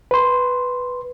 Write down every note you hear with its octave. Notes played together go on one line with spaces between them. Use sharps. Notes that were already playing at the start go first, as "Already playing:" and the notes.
B4 C6